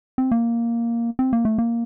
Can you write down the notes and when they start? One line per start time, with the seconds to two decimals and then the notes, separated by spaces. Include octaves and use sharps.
0.18 C4
0.31 A#3
1.19 C4
1.33 A#3
1.45 A3
1.58 A#3